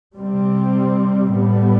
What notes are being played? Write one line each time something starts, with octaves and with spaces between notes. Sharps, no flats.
C3 G3 C4
A2 G3 B3